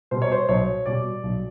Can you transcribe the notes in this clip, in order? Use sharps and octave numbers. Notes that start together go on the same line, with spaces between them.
B2 G3 C5
C#5
C5
B1 C#5
B2 G3 D5
B1